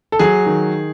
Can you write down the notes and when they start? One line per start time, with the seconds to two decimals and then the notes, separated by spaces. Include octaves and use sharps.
0.12 A4
0.19 F#3 G#4
0.46 D#3